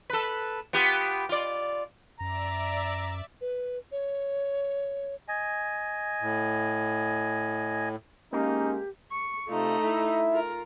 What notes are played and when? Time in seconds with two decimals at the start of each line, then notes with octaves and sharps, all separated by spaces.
0.10 A4 B4
0.73 B3 F4 G4
1.29 F4 D5
2.20 F#2 D5 E5 A#5 D6
3.41 B4
3.92 C#5
5.28 D#5 G#5
6.21 A2
8.33 G#3 A#3 C#4 D#4 G4
9.11 C#6
9.49 C3 A3 D#4 F4
9.84 E4 E5
10.32 F4 A#4